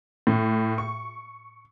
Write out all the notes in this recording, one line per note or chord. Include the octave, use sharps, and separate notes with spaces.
A2
C#6